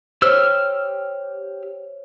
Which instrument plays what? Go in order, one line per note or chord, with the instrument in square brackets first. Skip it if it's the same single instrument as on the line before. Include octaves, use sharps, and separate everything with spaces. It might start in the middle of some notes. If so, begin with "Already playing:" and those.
[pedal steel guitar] G4 E6 F6 [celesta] C5 C#5